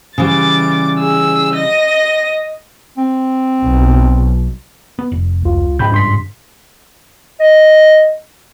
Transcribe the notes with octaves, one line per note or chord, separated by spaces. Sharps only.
C#3 E3 G3 D6 A6
G#4 E6
D#5 A#6
C4
B1
B3
F1
C#2 F4
G#2 C#3 G5 B5 G6
G2 C6 B6
D#5